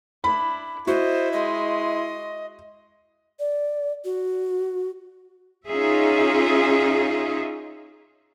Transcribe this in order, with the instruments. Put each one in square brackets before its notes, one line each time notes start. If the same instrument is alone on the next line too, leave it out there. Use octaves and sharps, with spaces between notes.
[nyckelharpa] D4 E4 [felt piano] B5
[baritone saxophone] E4 [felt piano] F#4 [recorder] C5 [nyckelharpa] D#5
[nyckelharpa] G#3 C6 [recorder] D#5
[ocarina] D5
F#4
[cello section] C#4 D#4 F4 G#4 E5